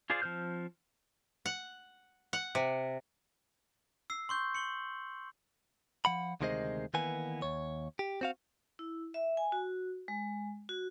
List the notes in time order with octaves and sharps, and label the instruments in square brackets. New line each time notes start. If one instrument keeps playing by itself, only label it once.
[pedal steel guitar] F4 G#4 C5 D5 F5
F3 C4 C5 F6 G6
[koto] F#5
F#5
C3
[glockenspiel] E6 C7
C6 C#6 G6
C#7 F#7 G7
[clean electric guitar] F3 F#5 B5
D2 C3 D#3 G#3 C5 D#5
D#3 E3 A#3 B3 G#5
D#2 C#5
G4
C4 F#4 F5
[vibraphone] E4
E5
G#5
F#4
G#3
F#4